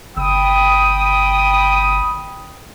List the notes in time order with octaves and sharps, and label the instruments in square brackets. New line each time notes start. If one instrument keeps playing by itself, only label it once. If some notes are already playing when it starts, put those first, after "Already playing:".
[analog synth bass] G1 [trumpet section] G5 B5 D#6